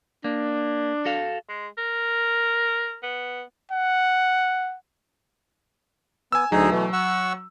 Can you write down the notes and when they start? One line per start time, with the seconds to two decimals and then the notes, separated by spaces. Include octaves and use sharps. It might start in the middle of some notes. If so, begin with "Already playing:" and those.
0.24 A#3 D4
1.05 F#4 A4 F5
1.49 G#3
1.78 A#4
3.03 B3
3.72 F#5
6.32 B3 G#5 E6
6.52 D2 F#3 D#4 G#4
6.71 B2 E3 A3
6.93 F#5 C#6 E6